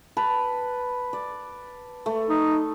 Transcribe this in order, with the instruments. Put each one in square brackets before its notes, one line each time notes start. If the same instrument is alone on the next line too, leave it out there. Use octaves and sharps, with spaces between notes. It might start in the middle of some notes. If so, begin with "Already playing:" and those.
[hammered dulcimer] B4 A5
D5
A3
[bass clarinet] D#4